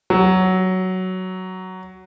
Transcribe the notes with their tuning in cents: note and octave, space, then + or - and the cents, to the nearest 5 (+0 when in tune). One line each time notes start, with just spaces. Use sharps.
F#3 +10